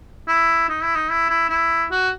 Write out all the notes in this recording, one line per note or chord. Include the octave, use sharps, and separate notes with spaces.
E4
D#4
E4
D#4
E4
E4
E4
F#4